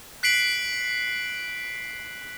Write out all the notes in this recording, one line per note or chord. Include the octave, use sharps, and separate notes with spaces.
F#6 B6 C7 D7 F#7